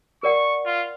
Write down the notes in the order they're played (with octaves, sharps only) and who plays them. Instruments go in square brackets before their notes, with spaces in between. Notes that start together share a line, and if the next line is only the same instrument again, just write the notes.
[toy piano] A#4 D5 F#5 [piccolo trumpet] C#6
[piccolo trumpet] F4